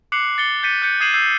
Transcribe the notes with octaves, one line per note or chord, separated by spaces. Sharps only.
D6 F#6 C7 C#7 F#7
A6 C#7 G7
G6 A6 B6 C#7 D#7
F#6 G6 C#7
D#6 G#6 C7 D#7 E7 F#7
E6 G6 C7